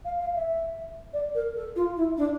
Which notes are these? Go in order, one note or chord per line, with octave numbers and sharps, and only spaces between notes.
F5
F5
E5
D5
A#4
A4
F4
E4
D4